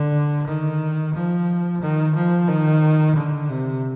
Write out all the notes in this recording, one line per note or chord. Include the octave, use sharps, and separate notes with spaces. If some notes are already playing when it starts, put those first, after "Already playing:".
Already playing: D3
D#3
F3
D#3
F3
D#3
D3
C3